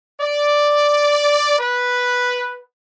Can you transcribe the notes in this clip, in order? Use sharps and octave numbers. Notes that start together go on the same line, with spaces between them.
D5
B4